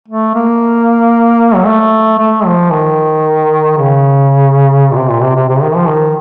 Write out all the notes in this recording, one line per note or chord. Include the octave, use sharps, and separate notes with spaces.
A3
A#3
F#3
A3
A3
F3
D#3
C#3
A#2
C3
A#2
C3
C3
C3
C#3
D#3
F3
D#3